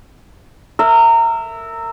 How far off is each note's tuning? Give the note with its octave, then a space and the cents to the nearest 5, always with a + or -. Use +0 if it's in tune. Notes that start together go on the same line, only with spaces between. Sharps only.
A#4 -25 E5 +0